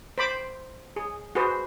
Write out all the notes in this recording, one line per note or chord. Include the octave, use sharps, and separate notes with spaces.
C5 B5 D6
G#4
F#4 G#4 B4 C5